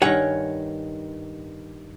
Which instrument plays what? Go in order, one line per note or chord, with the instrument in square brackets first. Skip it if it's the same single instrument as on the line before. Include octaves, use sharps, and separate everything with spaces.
[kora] G2 D#3 [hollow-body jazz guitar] C#5 F#5 G#5